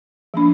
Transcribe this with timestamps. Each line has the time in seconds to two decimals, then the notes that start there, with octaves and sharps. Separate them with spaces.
0.34 F3 A#3 D4